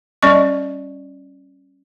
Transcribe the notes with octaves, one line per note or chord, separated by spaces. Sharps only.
G3 C#4 D5 D#5 C#6